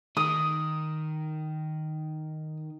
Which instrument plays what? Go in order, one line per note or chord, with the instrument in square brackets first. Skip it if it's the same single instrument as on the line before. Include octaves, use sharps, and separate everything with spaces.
[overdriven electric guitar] D#3 [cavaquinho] D#6